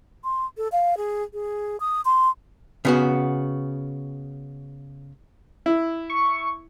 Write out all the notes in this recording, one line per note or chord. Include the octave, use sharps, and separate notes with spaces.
C6
A4
F5
G#4
G#4
D#6
C6
C#3 B3 F#4
E4
C#6